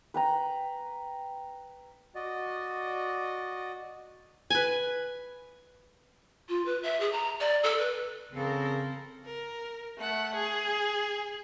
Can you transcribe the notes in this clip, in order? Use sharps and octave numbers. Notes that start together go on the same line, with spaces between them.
B4 G5 A#5
F#4 D5 D#5
B4 G#5
F4
B4
E5
G#4
A#5
D5
A4
B4
C#3 C4 A4 A#4
A#4
A3 F#5
G#4